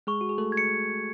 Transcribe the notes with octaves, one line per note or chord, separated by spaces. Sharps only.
G#3 G#4 C#6
F#4
G#4
A3 A4
G#6
C#7